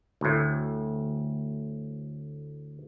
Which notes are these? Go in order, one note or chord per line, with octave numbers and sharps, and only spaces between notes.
D2 A2